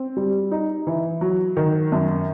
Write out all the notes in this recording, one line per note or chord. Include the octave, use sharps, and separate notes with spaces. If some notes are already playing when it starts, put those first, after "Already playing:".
Already playing: C4
G3
D#4
E3
F#3
D#3
F#2